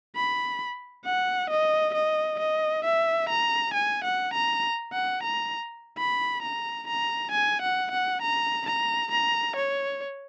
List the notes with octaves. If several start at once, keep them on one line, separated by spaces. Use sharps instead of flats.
B5
F#5
D#5
D#5
D#5
E5
A#5
G#5
F#5
A#5
F#5
A#5
B5
A#5
A#5
G#5
F#5
F#5
A#5
A#5
A#5
C#5